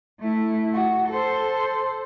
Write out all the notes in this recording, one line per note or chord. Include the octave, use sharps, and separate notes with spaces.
A3 E4
F#4
A4 C5